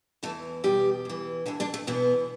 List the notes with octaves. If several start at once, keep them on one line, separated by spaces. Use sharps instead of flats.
E2 E3 A3 A4
E2 B2 G3 G4
E2 E3
D2 D3 E3 E4
D3 D4
A3
E2 B2 E3 B3